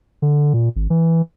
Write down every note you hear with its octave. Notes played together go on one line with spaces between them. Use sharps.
D3
A#2
G#1
E3